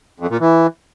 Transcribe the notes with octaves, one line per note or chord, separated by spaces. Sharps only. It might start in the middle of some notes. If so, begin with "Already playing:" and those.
F2
A#2
E3